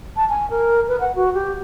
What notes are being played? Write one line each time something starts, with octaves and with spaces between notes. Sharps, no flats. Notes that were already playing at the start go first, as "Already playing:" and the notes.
A5
G#5
A#4
B4
F#5
F#4
G4